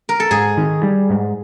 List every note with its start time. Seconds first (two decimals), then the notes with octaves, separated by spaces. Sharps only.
0.09 A#4
0.20 A4
0.31 G#2 G#4
0.57 D#3
0.83 G3
1.10 G#2